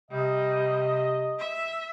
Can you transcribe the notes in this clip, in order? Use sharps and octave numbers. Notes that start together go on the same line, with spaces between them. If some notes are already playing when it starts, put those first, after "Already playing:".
C3 G3 D#5
E5